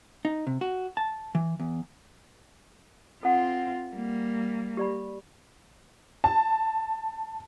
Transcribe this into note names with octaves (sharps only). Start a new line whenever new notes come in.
D#4
C3
F#4
A5
E3
E2
C4 F4 A4 F#5
G3 A#3
G4 D5 B5
A5